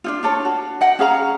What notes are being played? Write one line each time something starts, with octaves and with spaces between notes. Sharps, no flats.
D4 D#4 F4
D4 F4 A4 C#5
F#4
D#5 F#5 G5
C#4 G#4 F5 A#5